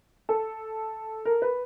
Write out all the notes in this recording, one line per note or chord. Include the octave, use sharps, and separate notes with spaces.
A4
A#4
B4